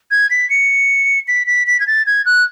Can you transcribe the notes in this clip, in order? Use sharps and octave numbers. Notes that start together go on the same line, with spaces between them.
G#6
B6
C#7
B6
B6
B6
G#6
A6
G#6
F#6